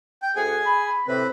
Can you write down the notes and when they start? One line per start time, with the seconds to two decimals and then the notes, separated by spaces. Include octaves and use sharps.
0.23 G5
0.36 D2 G#4 F#5 G#5
0.66 B5
1.08 A2 C3 C4 B4 B5